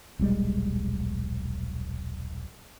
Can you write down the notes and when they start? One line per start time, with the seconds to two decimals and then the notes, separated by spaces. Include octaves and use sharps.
0.19 D#1 B1 G3 G#3